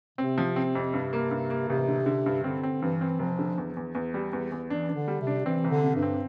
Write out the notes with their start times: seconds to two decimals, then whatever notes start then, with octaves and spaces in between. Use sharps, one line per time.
0.18 C3 C4
0.38 F3
0.56 C4
0.75 F2
0.94 G2
1.13 A#3
1.31 G2
1.50 A#3
1.68 A1 C3
1.88 D3
2.06 D3
2.26 G2
2.44 D3 C4
2.63 C4
2.82 G2 E3
3.01 C4
3.19 F1 F3
3.39 D3
3.58 E2
3.77 E2
3.95 E2
4.14 G3
4.33 E2
4.52 E2
4.70 E3 D4
4.89 D4
4.95 D3
5.08 G3
5.21 C3
5.27 D4
5.46 E3 C4
5.64 C2
5.70 D3
5.84 C3
5.96 G2
6.02 C4